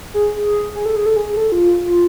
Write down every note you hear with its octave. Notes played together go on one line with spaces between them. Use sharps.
G#4
G#4
A4
G#4
A4
G#4
A4
F4